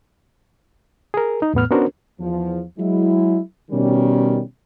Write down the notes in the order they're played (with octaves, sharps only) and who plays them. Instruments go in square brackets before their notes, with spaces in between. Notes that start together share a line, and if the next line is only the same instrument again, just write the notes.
[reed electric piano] G#4 A#4
D#4
E2 A2 B3 F6
B3 C#4 D4 F#4 A#4 C5
[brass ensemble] E2 F3
F#3 G#3 E4
B2 D#3 G3 C#4